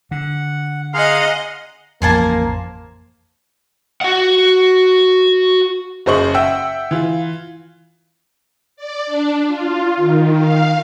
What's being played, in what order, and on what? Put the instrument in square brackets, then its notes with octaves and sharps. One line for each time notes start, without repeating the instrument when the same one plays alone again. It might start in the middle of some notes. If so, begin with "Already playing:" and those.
[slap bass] D3 [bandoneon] F#5
[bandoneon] G#4 A#5 C6 [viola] D#5 F#5 [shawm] F5
[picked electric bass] A1 F2 [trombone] A#3 [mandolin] C5 G#5 A5
[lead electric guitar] F#4 F#5
[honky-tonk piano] F#1 C#3 C5 D#5 C#6 F#7
E5 F#5 G5 E6
E3 F4
[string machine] D5
D4
F4
D#3
F5